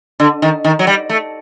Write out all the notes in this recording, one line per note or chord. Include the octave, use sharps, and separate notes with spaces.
D3
D#3
D#3
F#3
G3
A3